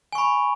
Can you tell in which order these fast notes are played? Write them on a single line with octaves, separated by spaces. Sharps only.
G#5 C#6 B5